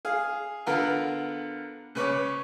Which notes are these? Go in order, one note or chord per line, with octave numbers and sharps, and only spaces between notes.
G#4 F5
D3 B3 F4 A#4 B4 F6
C#3 B4 C#5 D6